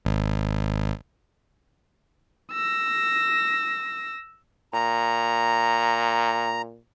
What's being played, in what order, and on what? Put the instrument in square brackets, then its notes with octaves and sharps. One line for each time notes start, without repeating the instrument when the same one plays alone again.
[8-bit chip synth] G#1
[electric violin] E6 A#6
[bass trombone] A#2 [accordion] A#5